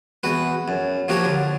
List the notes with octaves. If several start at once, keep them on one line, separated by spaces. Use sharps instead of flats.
E2 F#4 B4
F#2
F3 A#3 F#4 G4 C#5
D3